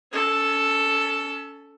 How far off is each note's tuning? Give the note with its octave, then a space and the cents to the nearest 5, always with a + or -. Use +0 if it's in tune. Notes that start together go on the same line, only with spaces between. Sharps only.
C#4 +30 A4 +0